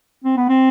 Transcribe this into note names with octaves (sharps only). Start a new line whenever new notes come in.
C4
B3
C4